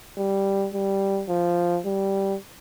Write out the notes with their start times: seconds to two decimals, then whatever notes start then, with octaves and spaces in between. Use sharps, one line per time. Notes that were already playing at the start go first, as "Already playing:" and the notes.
0.18 G3
0.74 G3
1.29 F3
1.85 G3